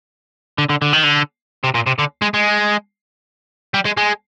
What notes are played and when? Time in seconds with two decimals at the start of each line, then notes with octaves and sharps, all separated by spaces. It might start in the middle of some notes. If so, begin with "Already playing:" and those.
0.58 D3
0.70 D3
0.82 D3
0.93 D#3
1.04 D3
1.64 C3
1.75 A#2
1.87 C3
1.99 D3
2.22 G#3
2.34 G#3
3.74 G3
3.85 G#3
3.97 G#3